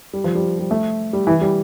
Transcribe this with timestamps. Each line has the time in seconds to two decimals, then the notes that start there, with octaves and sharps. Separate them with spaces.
0.13 G3
0.24 F3
0.35 G3
0.59 G3
0.71 A3
1.13 G3
1.27 E3
1.41 G3